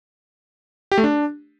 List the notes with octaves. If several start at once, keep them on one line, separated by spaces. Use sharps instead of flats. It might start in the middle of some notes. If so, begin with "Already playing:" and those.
G4
A3
D4